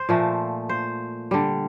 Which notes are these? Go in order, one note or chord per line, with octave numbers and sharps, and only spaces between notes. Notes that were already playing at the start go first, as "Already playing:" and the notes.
Already playing: C5
A#2 F3 A3
C5
D3 G3